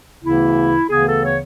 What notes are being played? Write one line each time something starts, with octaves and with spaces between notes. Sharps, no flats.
D2 C#3 E3 B3 E4
D2 C#3 E3 B3 G#4
A4
C#5